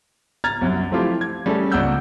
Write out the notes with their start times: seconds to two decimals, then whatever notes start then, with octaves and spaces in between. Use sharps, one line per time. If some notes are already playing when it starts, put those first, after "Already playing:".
0.44 A#5 F6 G#6 A6
0.61 C2 F#2 F#3
0.91 F3 A3 C4 E4 F4 G4
1.21 G#6
1.46 G3 A3 C#4 G#4 A4
1.72 C#2 D5 F#5 A#5 E6 G6